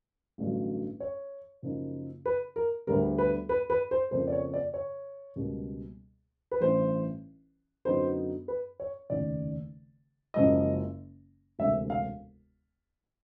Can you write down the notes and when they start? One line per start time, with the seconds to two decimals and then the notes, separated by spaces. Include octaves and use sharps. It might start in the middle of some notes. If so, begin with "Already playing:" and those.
0.38 A1 G2 D3 F#3
1.00 C#5
1.62 F#2 C#3 F3 A#3 D#4
2.26 B4
2.56 A#4
2.87 D2 D3 G3 B3 A#4
3.18 B4
3.49 B4
3.70 B4
3.91 C5
4.11 F2 C#3 F3 A#3 C5
4.27 D5
4.32 C#5
4.54 D5
4.74 C#5
5.36 C#2 B2 G3 A#3
6.51 B4
6.60 A1 G2 E3 C5
7.85 F#2 D3 F#3 B3 D#4 C5
8.48 B4
8.80 C#5
9.10 F1 D#2 C#3 D5
10.34 F#1 F#2 C#3 F3 G#3 D#5
11.59 E1 D2 C3 E5
11.90 F5